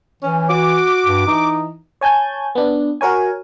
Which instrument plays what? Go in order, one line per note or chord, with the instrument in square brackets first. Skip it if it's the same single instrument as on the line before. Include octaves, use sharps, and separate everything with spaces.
[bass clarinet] E3 [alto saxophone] C#4
[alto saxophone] F#4 [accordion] D6
[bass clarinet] G2
[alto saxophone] E3 [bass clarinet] D#4
[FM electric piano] C#5 G#5 A5 G6 G#6
B3 D4
F#4 A#4 C#5 G#5